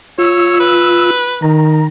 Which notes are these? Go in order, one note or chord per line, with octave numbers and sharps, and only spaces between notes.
F4 C#5 E6
B4
D#3 A#5